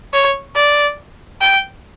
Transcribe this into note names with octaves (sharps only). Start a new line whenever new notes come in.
C#5
D5
G5